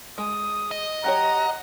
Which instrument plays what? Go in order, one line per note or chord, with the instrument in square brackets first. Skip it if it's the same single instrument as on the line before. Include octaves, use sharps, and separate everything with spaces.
[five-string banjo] G#3 [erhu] D#6
[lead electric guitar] D#5
[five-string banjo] F#3 G4 C#5 [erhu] F#5 [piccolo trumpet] A#5